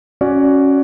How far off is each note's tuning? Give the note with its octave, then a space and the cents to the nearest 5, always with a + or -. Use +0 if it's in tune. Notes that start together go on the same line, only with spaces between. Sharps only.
C#4 +0 F#4 +0 D5 -10